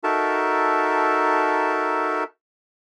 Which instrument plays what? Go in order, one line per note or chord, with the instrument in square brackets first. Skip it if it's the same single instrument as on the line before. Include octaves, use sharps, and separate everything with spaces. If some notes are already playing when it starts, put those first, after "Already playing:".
[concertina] D#4 F#4 A4 A#4 E5 A5